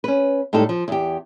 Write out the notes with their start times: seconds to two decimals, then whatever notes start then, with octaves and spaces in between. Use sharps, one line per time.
0.04 C#4 B4
0.53 A2 G3 G#3 D#4 A4
0.69 F3
0.88 E2 G4